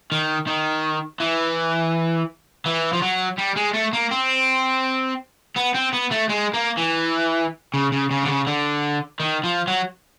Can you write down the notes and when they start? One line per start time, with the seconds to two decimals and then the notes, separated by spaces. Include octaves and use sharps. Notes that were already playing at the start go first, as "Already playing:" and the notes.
0.12 D#3
0.47 D#3
1.20 E3
2.66 E3
2.93 F3
3.02 F#3
3.38 G3
3.57 G#3
3.74 A3
3.93 A#3
4.11 C4
5.56 B3
5.74 C4
5.93 B3
6.11 A3
6.29 G#3
6.54 A#3
6.77 E3
7.74 C#3
7.92 C#3
8.11 C#3
8.23 D3
8.28 C#3
8.47 D3
9.20 D#3
9.44 F3
9.67 F#3